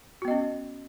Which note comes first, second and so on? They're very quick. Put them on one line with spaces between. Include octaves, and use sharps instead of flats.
F#4 B3 D#5 C#4